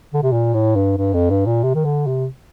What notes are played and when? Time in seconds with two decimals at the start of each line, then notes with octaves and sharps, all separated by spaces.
0.14 D3
0.23 C3
0.32 A#2
0.54 A2
0.75 G2
0.97 G2
1.14 F2
1.30 G2
1.46 A#2
1.63 C3
1.75 D#3
1.85 D3
2.07 C3